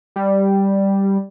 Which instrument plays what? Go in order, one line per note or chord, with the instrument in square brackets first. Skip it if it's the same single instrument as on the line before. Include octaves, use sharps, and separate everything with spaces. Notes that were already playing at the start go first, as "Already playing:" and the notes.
[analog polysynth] G3